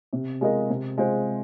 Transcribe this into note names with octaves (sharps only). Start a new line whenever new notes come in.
C3
G#3 F4 A#4 D#5
C3
G#3 F4 G#4 C5